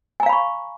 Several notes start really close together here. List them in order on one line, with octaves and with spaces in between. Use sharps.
G#5 A#5 F5 B5 C#6